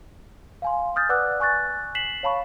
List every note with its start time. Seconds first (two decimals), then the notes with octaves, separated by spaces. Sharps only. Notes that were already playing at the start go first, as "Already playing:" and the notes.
0.62 F5 G#5 C6
0.96 D#6 F6 G6 A6
1.09 B4 D5 F#5 D6 E6 F#6
1.40 G#5 C#6 F#6 A6
1.95 B6 C7 E7 F#7
2.23 C#5 F5 A5 B5 C#6